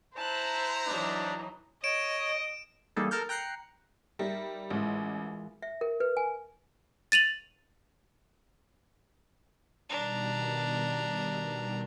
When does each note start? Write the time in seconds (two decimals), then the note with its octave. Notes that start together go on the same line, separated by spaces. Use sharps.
0.16 E4 C5 A5 A#5 F#6
0.87 E3 F#3 D4 D#4
1.84 C#5 D#5 D7 E7
2.96 E3 G3 A#3 D#4 G#4 A4
3.11 A4 A#4 A5 F6 G6
3.29 G5 A#5 F#6 C7 C#7
4.19 G3 D#4 A#4 E5
4.70 A1 E3 G#3 F4
5.62 E5
5.81 A#4
6.00 B4
6.17 G#5
7.12 A6 D#7 F7 F#7
9.89 B2 D#3 G3 D4 A#5